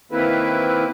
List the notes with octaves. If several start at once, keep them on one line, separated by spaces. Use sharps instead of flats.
D#3 A#3 C4 E4 B4